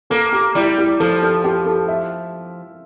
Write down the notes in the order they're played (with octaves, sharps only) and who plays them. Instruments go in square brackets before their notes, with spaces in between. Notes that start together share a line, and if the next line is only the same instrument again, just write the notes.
[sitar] A#3 [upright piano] A4
[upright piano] G4
[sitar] G3 [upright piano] E4
[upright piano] G4
[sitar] F3 [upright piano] A4
[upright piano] A4
G4
A4
E5